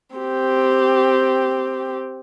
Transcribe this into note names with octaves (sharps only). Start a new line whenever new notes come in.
C4 G4